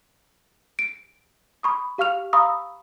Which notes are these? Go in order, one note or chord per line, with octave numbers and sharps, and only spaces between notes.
D7
B5 C#6 D#6
G4 F5 C#6 F6 F7
F5 A#5 B5 C#6 D#6 E6